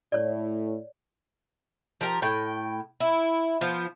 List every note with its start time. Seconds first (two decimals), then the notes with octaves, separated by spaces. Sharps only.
0.12 A2 C#5 D5
2.01 F3 G4 A#4
2.22 A2 G5
3.00 E4
3.61 F3 B3